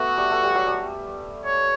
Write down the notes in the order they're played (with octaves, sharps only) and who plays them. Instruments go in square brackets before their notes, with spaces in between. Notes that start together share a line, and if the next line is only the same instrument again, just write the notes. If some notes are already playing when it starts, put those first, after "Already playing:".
Already playing: [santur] A3 B3 [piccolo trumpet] F#4
[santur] G3
A3
G3
F#3
G3
[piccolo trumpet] C#5